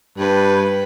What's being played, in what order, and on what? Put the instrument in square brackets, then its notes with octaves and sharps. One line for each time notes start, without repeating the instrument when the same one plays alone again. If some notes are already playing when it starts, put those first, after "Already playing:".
[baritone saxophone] G2 [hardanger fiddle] B4